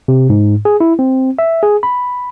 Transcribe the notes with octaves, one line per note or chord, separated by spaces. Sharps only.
C3
G#2
G#4
E4
C4
E5
G#4
B5